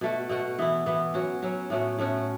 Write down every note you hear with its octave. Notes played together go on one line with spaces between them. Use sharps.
B2 A3 F#4
B2 A3 F#4
E3 B3 E4
E3 B3 E4
F#3 C#4 F#4
F#3 C#4 F#4
A2 A3 C#4 F#4
A2 A3 C#4 F#4